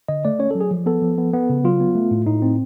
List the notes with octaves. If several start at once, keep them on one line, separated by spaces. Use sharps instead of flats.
D3 D#5
A3 D5
C#4 C#5
F#3 A4
G#4
F3
B3 A4
F3
B3
B3
C#3
F#3 F4
B3
A3
A2
A2 D#4
C4